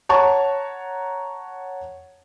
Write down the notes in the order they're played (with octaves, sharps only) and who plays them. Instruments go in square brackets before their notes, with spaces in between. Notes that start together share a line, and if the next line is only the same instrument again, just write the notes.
[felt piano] C#5 F#5 A5 A#5 C#6